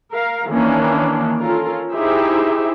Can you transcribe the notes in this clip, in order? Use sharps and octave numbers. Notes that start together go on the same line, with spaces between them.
A#4 F5
D#3 E3 A#3 C#4 D4
C#4 F4 A4 A#4
D#4 E4 G4 G#4 C5 E5